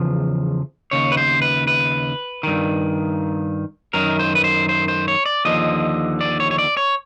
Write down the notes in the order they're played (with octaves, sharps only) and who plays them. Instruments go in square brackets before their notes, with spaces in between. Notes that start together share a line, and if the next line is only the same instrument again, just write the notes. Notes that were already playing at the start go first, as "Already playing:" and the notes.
Already playing: [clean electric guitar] E2 C#3 F3
D#2 C#3 C#5
B4
C5
B4
B4
G2 D#3
F#2 D#3 A#4
C5
B4
C5
C5
C5
C#5
D5
D#2 D3 F3 D#5
D5
C#5
C#5
D5
C#5